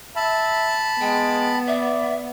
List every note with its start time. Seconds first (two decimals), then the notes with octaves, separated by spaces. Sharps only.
0.16 E5 A5 B5
1.01 G#3 B3 G5
1.68 D5 E5